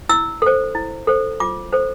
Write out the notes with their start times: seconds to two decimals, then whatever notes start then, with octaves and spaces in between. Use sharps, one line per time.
0.09 E4 E6
0.42 A4 C5
0.75 E4
1.07 A4 C5
1.40 F4 D6
1.73 A4 C5